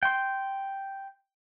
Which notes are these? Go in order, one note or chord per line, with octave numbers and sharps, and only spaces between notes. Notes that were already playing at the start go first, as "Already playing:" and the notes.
G5 C6